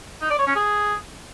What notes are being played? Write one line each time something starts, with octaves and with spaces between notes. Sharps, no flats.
D#4
D5
C#5
C#4
G#4